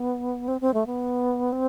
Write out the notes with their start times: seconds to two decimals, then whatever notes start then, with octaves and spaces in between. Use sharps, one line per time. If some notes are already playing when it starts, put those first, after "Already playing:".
Already playing: B3
0.48 C4
0.61 C4
0.74 A3
0.86 B3
1.53 C4